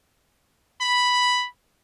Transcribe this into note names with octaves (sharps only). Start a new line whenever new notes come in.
B5